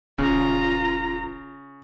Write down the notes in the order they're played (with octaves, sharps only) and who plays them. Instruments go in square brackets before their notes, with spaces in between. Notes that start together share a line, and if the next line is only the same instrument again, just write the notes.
[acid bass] D#1 [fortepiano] C#3 [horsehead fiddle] F4 A#5